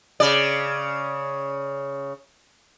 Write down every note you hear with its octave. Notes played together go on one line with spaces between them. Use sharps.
C#3 D5